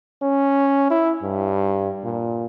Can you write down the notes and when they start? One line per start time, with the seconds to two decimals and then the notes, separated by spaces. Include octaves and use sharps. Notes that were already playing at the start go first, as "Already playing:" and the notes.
0.22 C#4
0.91 E4
1.23 G2
2.04 A#2